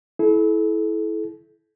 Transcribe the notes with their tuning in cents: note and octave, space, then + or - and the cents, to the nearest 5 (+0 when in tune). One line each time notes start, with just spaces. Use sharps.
E4 +0 A4 -40